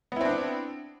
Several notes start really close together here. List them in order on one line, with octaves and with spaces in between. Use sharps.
B3 E4 C4 D4